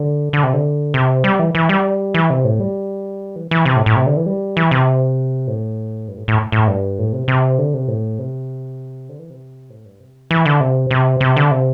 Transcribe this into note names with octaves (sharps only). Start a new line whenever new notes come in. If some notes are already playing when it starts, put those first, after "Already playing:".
Already playing: D3
D3
C3
D3
C3
G3
E3
E3
G3
E3
C3
A2
G3
E3
E3
C3
A2
A2
C3
D3
E3
G3
E3
C3
A2
G2
A2
A2
A2
G2
A2
C3
C3
D3
C3
A2
C3
D3
E3
C3
A2
G2
C3
E3
D3
C3
C3
C3
D3
C3